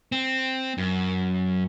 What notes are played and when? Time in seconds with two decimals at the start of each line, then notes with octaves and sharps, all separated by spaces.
0.12 C4
0.78 F#2